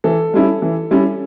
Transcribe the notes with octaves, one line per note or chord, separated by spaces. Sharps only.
E3 A4
G3 C#4 E4
E3
G3 C#4 E4